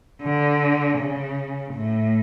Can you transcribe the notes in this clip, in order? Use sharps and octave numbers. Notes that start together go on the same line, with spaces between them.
D3
C#3
A2